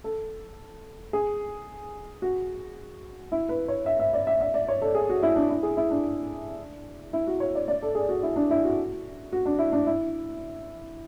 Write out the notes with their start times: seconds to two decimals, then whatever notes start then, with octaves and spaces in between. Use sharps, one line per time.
0.04 A4
1.13 G#4
2.22 F#4
3.32 E4
3.49 B4
3.68 C#5
3.86 E5
3.99 E5
4.13 D5
4.27 E5
4.41 E5
4.54 D5
4.68 C#5
4.82 A4
4.95 G#4
5.09 F#4
5.23 E4
5.36 D4
5.49 E4
5.63 G#4
5.77 E4
5.90 D4
7.13 E4
7.27 F#4
7.40 C#5
7.55 D5
7.68 D5
7.82 A4
7.95 G#4
8.09 F#4
8.23 E4
8.36 D4
8.51 E4
8.64 F#4
9.32 F#4
9.46 D4
9.59 E4
9.72 D4
9.87 E4